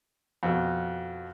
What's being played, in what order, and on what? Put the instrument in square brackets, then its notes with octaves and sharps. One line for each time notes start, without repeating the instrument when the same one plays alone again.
[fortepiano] F2 B2